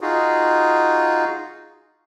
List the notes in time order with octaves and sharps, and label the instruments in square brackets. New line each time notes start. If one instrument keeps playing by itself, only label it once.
[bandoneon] D#4 F4 F#4 G#4